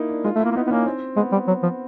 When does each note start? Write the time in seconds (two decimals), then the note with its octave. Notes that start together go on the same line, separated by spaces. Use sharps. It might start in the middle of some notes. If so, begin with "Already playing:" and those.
Already playing: A#3 D#4 E4
0.09 D4
0.24 G#3 F4
0.35 A3
0.40 A#3 E4
0.52 A#3
0.56 B3 D#4
0.67 B3
0.71 A#3 C#4
0.86 C4
1.16 G#3 B3
1.32 G3
1.48 F#3
1.63 F3